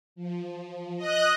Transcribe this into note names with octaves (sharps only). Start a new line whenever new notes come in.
F3
D#5 F#6